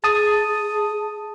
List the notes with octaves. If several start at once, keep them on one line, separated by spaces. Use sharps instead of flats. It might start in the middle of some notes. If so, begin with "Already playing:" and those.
G#4 A5 D#6